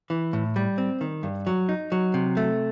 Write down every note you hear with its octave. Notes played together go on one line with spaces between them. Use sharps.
E3
A2
G3
C4
D#3
G2
F#3
D#4
F#3
C3
A3